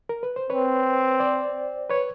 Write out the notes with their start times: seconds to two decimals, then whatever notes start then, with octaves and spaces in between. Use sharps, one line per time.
0.09 A#4
0.23 B4
0.36 C5
0.50 C4 B4 C#5
1.20 C5 D5
1.90 B4 C#5